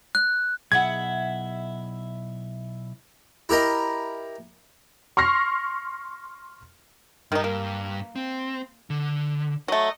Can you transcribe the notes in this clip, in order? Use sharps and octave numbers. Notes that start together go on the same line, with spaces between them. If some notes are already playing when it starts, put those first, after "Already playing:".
F#6
B1 E4 G#4 E5 F#5 G#6
E4 G4 A#4 D#5
C6 C#6 F6 A#6 C7
G2 D#3 G3 D#4
A#3
C4
D3
F#3 A3 D#5